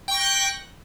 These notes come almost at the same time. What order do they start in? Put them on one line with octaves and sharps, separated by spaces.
G5 C#6 A#6 G6 F#6